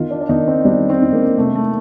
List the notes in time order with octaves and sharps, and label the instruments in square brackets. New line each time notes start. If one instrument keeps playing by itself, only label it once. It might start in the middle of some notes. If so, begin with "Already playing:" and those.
Already playing: [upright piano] D#3 [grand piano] F4
[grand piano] D4
D4
[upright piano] D#3 [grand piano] D#4
[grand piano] C4
[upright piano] G3 [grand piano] D4
[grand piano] C4
[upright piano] D4
[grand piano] A#3
[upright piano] C3 [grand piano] A3
[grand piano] A3